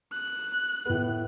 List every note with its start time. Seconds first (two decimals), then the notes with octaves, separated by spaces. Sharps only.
0.13 F#6
0.86 A2 B3